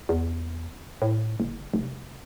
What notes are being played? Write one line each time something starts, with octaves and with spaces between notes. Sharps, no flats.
E2
A2
F#1
F1